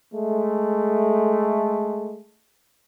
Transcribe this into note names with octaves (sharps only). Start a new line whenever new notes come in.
G#3 A3